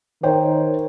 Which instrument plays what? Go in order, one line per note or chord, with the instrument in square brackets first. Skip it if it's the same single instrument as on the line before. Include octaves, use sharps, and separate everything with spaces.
[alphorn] D#3 [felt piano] C5 C#5 G5